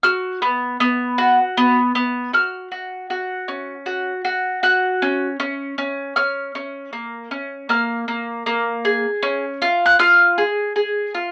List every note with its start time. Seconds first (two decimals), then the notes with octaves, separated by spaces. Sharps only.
0.03 F#4 F6
0.42 B3
0.80 B3
1.18 F#4
1.57 B3
1.95 B3
2.33 F#4 F6
2.72 F#4
3.10 F#4
3.48 C#4
3.86 F#4
4.25 F#4
4.63 F#4 F#6
5.02 C#4
5.40 C#4
5.78 C#4
6.16 C#4 F6
6.55 C#4
6.93 A#3
7.31 C#4
7.69 A#3 F6
8.08 A#3
8.46 A#3
8.85 G#4
9.23 C#4
9.62 F4
9.86 F#6
9.99 F4 F6
10.38 G#4
10.76 G#4
11.14 F4